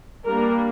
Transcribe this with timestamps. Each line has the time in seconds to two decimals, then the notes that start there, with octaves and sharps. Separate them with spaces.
0.25 G3 A#3 D4 A#4